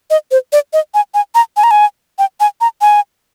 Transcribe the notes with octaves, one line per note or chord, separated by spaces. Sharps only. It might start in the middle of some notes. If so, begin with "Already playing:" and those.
D#5
C5
D5
D#5
G#5
G#5
A#5
G#5
A#5
G#5
G5
G#5
A#5
G#5